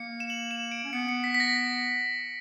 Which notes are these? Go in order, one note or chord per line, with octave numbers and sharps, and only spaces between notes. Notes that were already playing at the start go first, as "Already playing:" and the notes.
Already playing: A#3 C#7
E7
F#7
E7
D7
C#4
B3 C#7
C#7
B6
B6
A#6